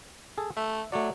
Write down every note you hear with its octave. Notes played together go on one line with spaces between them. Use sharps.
G#4 A4
A3 E5
F#3 A3 D5